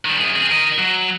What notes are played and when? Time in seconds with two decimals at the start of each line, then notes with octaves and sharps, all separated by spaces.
0.05 D#3 G3
0.18 F#2 G#4
0.35 C4 G#4
0.51 A#4 D#5
0.78 F#3